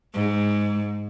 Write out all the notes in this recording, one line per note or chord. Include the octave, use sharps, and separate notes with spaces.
G#2